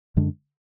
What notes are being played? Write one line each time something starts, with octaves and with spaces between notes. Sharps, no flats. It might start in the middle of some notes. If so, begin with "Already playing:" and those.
F#2 D3 G#3 D4